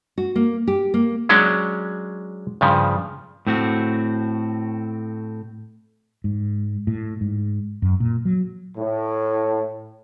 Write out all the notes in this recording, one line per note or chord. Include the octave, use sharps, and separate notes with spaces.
F#4
A#3
G4
A#3
F#3 G#3 C#4 D4
G2 C#3 F3
A2 C4 F#4
G#2
A2
G#2
F#2
A#2
F#3
A2